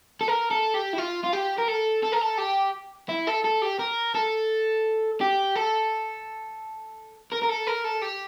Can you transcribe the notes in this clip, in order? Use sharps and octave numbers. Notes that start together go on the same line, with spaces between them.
A4
A#4
A4
G4
E4
F4
F4
G4
A#4
A4
A4
A#4
A4
G4
E4
A4
A4
G4
A#4
A4
G4
A4
A#4
A#4
A4
A#4
A4
G4